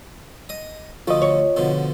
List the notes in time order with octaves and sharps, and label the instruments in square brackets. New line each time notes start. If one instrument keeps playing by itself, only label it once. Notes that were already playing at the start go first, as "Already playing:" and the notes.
[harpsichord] D#5 D#6
[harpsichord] D2 F3 A3 [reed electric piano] F4 D#5
[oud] C#5
[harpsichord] B2 D3 F3